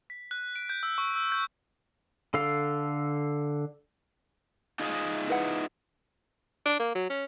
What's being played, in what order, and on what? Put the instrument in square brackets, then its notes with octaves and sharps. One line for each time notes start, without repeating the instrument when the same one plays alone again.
[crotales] B6
F#6
D7
G6
E6
C#6
E6
G6
[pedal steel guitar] D3 A4 F5
[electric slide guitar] D#4 F4 G#4
[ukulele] E4 B4 F#5
[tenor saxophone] D4
A#3
F#3
C#4